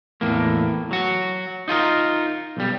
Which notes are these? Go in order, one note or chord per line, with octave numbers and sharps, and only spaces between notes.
E2 A2 A#3
F#3 F#4
D#4 F4 G#4 A#4
B1 G3